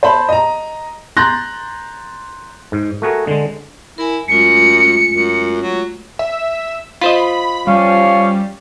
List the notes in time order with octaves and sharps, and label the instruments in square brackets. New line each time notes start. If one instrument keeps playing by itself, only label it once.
[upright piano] C5 A5 B5
D#5 A#5
A#5 C6 F#6 G6 A6 A#6
[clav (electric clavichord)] G#2
A3 F#4 G#4 A#4
D3 G#3
[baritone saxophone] E4 [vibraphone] A#4 G#5
[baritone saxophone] F#2 [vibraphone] G#3 A3 F4 [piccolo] C#7
[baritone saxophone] F#2
F#3
[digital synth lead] E5
[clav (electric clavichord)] F4 C5 D#5 [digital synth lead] B5
[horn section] F3 C#4 F5 [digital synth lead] G3